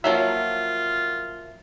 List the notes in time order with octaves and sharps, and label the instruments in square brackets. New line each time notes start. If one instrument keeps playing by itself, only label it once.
[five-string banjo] F3 F#3 A#3 [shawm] F4 [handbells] F#4 A#4 [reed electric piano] E5